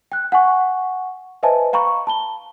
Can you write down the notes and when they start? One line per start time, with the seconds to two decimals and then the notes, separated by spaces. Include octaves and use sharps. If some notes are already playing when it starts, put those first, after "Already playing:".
0.12 G5 F#6
0.32 F#5 G#5 C#6
1.43 B4 C5 D#5 E5 G#5 A5
1.73 F5 G5 A#5 B5 C#6
2.07 A5 B5 G7